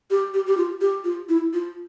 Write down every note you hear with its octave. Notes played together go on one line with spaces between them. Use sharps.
G4
G4
G4
F4
G4
F4
E4
F4